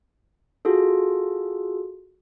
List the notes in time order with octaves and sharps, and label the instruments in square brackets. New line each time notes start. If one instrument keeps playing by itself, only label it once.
[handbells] F4 F#4 G#4 A4